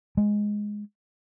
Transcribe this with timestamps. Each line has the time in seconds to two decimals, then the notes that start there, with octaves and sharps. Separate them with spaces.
0.17 G#3